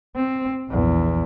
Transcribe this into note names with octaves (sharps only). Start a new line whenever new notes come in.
C4
A#1 E2